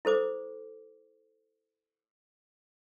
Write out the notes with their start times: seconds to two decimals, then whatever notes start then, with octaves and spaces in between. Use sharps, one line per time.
0.05 E4 A4 C5 D6